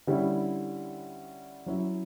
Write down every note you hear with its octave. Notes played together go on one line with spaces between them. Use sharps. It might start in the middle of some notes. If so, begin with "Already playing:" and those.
D3 G3 C#4 E4
F#3 C#4 E4